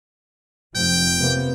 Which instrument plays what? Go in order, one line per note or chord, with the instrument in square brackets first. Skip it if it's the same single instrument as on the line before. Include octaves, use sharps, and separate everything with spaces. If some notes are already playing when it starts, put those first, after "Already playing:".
[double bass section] F1 F3 [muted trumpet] G5
[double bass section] C3 A#3 B3